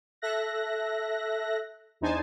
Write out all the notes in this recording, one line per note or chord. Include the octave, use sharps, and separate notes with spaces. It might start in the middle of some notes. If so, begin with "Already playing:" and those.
A4 E5 F#6 A#6
E2 D4 D#4 C5 G#5 A5